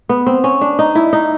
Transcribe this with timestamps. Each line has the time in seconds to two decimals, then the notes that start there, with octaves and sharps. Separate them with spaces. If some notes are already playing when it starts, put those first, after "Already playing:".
0.09 B3
0.26 C4
0.44 C#4
0.61 D4
0.79 D#4
0.95 E4
1.13 D#4